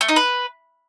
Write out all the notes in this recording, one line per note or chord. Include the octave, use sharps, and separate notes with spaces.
A3
D#4
B4